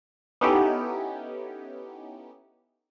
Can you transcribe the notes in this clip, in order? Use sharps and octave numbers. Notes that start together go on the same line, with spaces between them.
B3 C#4 D#4 E4 G4 A4